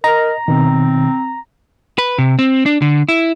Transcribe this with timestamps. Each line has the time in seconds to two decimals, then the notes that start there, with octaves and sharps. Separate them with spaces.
0.04 A#4 D#5 A#5
0.48 B2 D#3 C4
1.98 B4
2.18 C3
2.39 C4
2.66 D4
2.82 D3
3.09 E4